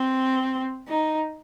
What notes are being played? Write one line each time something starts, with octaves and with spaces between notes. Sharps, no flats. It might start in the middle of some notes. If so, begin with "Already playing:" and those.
Already playing: C4
D#4